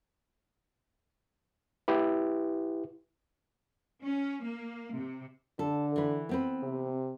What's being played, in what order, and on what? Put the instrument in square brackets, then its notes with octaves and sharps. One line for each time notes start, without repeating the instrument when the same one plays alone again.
[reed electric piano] E4 G4 B4
[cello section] C#4
A#3
C3
[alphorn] D3 [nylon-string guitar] A4
[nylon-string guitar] E3 B4
B3 C4 B4
[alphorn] C3